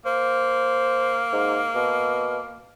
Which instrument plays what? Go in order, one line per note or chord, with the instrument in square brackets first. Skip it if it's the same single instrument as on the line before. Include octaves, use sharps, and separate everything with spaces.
[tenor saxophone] A#3 [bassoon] C5
[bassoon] G#2
B2